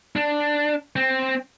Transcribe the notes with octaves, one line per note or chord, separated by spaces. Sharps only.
D4
C4